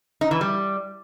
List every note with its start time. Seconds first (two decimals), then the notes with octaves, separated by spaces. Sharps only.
0.21 D#4
0.31 E3
0.41 G3